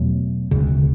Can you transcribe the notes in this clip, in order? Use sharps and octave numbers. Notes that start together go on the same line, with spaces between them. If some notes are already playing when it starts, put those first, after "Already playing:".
Already playing: E2 B2 F#3 A3
E1 D2 C#3